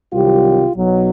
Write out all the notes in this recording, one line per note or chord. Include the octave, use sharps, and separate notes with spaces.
C2 C3 D#3 F#3 F4 G4
B1 B2 F#3